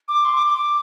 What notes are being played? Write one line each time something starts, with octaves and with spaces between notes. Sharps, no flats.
D6
C6
D6
D6